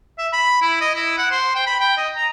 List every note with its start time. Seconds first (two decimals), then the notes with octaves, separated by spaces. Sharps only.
0.18 E5
0.33 B5
0.61 E4
0.81 D#5
0.95 E4
1.18 F#5
1.31 C5
1.55 G5
1.66 B5
1.80 G5
1.97 D#5
2.16 A#5